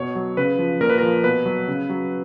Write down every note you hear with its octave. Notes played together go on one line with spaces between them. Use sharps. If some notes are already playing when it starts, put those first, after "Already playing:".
Already playing: B2 C#5
F#3
C#3 B4
F3
A#2 A#4
B4
F3 A#4
B2 B4
F#3
C#3
F#3